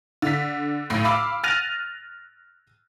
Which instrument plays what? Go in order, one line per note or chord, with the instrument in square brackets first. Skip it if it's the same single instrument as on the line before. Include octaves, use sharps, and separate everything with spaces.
[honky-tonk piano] D3 B6
B1 A2
F5 B5 D6 E6
F6 F#6 A6 A#6 D#7 F7